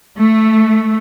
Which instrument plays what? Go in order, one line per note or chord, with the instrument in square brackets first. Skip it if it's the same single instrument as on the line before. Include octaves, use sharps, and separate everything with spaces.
[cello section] A3